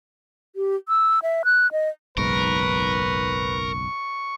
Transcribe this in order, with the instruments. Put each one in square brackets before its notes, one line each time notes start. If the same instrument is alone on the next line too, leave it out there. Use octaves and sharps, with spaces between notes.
[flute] G4
E6
E5
F#6
D#5
[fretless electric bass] F#1 B1 G#2 [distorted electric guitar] A#4 [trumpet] B4 [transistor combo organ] C#6